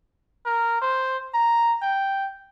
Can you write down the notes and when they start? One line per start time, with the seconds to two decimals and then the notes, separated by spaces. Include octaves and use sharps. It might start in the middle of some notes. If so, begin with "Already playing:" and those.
0.46 A#4
0.82 C5
1.34 A#5
1.82 G5